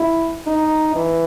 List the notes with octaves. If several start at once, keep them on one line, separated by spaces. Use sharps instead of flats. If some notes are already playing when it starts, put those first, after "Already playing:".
Already playing: E4
D#4
E3